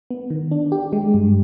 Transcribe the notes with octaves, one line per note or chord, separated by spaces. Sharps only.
B3
D#3
D4
G4
G#3
G2